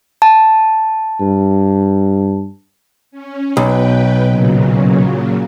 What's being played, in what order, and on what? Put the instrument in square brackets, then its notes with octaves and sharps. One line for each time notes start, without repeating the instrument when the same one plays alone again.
[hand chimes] A5
[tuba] G2
[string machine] C#4
[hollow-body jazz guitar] B1 [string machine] B2 B4 G5
[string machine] A#2 C#3 F#3